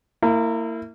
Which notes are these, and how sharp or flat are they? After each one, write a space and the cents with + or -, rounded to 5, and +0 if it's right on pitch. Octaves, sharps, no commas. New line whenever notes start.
A#3 -30 E4 +0